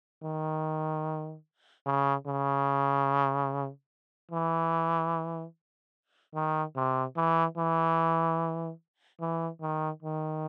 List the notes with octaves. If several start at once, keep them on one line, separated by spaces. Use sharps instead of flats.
D#3
C#3
C#3
E3
D#3
C3
E3
E3
E3
D#3
D#3